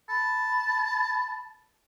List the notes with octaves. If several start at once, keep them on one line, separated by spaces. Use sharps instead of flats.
A5 B5